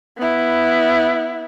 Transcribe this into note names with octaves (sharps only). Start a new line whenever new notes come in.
B3 E4